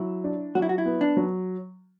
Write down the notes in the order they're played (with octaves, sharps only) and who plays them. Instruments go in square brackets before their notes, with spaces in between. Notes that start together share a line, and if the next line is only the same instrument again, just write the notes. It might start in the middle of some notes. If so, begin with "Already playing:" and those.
Already playing: [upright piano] F#3 [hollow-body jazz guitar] E4
[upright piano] D4
[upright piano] F#3 [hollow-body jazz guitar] F#4
[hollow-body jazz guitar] E4
F#4
E4
[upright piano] B3
[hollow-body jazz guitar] D4
[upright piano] F#3